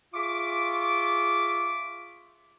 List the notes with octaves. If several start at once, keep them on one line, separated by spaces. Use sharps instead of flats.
F4 G#4 E5 C#6 D6